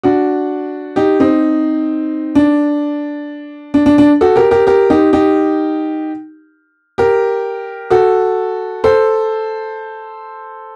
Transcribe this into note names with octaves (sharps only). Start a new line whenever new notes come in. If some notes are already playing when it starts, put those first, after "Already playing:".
D4 F#4
D#4 G4
C4 D#4
D4
D4
D4
D4
F#4 A4
G4 A#4
G4 A#4
G4 A#4
D#4 G4
D#4 G4
G4 A#4
F#4 A4
A4 C5